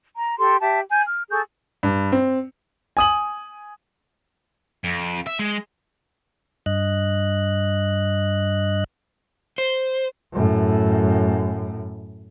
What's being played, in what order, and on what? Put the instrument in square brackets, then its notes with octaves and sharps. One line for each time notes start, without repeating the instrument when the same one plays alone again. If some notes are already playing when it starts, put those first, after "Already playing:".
[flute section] A#5
G4 A4 C6
G4 E5 A5
G#5 G6
F6
G#4 A4 C#6 G6
[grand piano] G2
C4
G#5 D#6 F#7
[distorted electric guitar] F2
E5
G#3
[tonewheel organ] G2 D#5 F#6
[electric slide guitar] C5
[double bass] F#2 A2